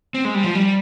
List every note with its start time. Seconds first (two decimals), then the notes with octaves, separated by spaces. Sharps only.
0.14 C4
0.25 G#3
0.35 G3
0.44 F3
0.55 G3